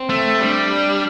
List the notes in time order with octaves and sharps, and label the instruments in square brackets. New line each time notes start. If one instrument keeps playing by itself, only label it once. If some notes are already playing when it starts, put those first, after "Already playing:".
Already playing: [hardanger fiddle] C4
[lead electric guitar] A3
[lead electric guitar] G3 [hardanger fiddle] D4